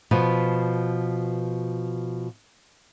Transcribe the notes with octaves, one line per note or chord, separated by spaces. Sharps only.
B2 F3 B3